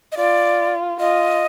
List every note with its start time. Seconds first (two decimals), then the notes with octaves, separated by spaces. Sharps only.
0.12 D#5
0.17 F4 D5
1.00 F4 D#5